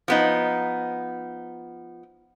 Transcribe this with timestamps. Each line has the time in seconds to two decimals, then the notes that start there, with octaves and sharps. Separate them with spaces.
0.08 F3 B3 D#4